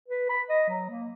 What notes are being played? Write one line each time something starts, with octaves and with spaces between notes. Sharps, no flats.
B4
B5
D#5
F#3
A#3